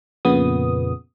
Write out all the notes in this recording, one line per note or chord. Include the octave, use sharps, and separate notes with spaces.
F2 A#2 C#3 B3 D#6